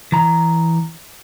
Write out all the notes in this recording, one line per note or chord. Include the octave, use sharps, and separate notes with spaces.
E3 A#5